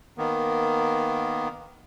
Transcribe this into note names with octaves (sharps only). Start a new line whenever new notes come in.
D#3 A#3 B3